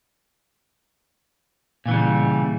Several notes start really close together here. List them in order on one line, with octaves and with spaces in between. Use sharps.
A#2 E3 C#3 G3